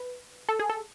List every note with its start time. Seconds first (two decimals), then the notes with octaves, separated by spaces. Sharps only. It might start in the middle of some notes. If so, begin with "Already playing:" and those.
Already playing: B4
0.49 A4
0.59 G#4
0.70 A4